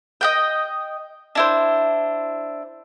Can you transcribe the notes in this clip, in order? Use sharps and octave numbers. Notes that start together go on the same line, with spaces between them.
D#5 F#5 G5
D4 E4 C5